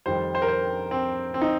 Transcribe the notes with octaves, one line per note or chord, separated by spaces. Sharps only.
F2 D#3 G3 C5
C5
A#4
C5
C4
C4
D#4